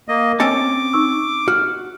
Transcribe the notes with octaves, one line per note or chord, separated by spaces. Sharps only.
A#3 D#5
C4 C#4 A5 D6 C#7
D#4 C#6 E6
F#4 F6